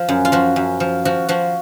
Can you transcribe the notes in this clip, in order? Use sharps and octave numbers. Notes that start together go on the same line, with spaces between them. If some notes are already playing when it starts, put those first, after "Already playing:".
Already playing: F3
F#2
F4
F3 F#4
F#2
F3
F3 F#4
F3 F#4